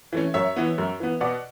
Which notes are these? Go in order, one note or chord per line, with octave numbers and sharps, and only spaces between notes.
E3 A3 C#4
F#2 C#5 E5
E3 B3
F#2
E3 B3
B2 D5 F#5